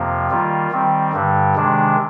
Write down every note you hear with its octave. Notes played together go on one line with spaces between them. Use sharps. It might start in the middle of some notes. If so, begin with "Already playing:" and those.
Already playing: F2 C3 F3 A#3
D#3 G3 A#3 F4
D#3 G3 C4
G2 D3 G3
C3 D#3 G#3 D4